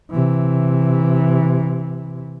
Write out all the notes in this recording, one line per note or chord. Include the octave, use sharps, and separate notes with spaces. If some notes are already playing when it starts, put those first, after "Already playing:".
C3 E3